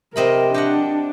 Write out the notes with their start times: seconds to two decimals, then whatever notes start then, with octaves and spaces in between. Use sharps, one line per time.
0.16 C3 C4 A#4 D#5 B5
0.54 D4 G4 D#5 F#5